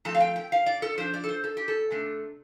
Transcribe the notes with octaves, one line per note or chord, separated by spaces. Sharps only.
F3 A3 C4 A5
F5
G5
G5
F5
D5
A4
F3 D4 C5
D5
A4
C5
A4
G4
A4
C3 A3 D4